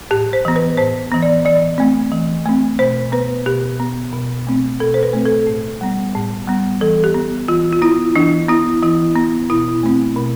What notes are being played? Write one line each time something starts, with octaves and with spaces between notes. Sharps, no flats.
A2 G4
C5
E3 B3
B4
A2 C5
E3 B3
D5
E3 D5
A3 C4
E3
A3 C4
B2 C5
B3 B4
B2 G4
B3
B2
A3 C4
B2 A4
C5
B4
A3 C4
A4
A2
G3 B3
A2
G3 B3
E3 A4
G4
B3
E3 F4
F4
B3 E4
E3 D4
B3 E4
E3 E4
B3
B2 E4
A3 C4
B2